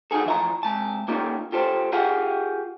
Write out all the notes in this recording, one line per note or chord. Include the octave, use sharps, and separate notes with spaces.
D#4 F4 F#4 G#4 A4
E3 F3 E5 A5 A#5
C3 G#3 A5
A#3 C#4 D#4 F4 G4 A4
F4 G4 A4 C5
F4 G4 G#4 F5 F#5